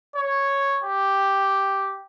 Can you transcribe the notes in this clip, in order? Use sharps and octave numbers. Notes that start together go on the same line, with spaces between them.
C#5
G4